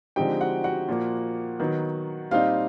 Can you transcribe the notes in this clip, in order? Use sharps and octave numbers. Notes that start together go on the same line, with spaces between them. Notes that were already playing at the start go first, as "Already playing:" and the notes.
D3 F3 G#3 C4 D#4 G4 G5
F#4 F#5
F#4 F#5
A#2 F3 A#3
D#3 F#3 B3 D#4
A#2 G3 C4 D#4 F4 F5